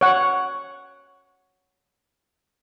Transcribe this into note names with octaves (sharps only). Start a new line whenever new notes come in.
C#5 F#5